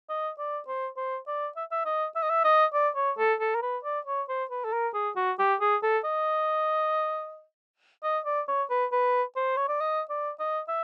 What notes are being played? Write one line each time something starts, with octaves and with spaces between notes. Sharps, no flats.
D#5
D5
C5
C5
D5
E5
E5
D#5
E5
D#5
E5
D#5
D5
C#5
A4
A4
A#4
B4
D5
C#5
C5
B4
A4
A#4
G#4
F#4
G4
G#4
A4
D#5
D#5
D5
C#5
B4
B4
C5
C#5
D5
D#5
D5
D#5
E5